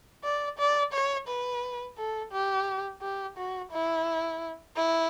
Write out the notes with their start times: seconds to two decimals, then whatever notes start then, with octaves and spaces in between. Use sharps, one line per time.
0.24 D5
0.59 D5
0.93 C#5
1.28 B4
1.98 A4
2.32 G4
3.01 G4
3.37 F#4
3.72 E4
4.76 E4